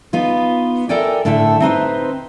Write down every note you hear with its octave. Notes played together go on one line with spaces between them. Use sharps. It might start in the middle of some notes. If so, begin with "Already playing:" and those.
B3 D#4 F4 B4
A4 A#4 D5 E5 G5 G#5
A2 D3 E5 G5 A5
C4 D#4 B4 C5